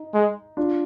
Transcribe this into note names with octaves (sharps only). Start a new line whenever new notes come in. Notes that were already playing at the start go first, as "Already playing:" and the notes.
Already playing: D#4
G#3
D4 F4